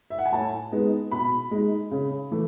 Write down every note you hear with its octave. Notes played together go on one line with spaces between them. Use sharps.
E5
F#5
G#5
A2 A5
G#3 B3 D#4
B2 B5
G#3 D#4
C#3
E3 A3